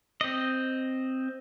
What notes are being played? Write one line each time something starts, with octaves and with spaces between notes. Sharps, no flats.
C4 D#5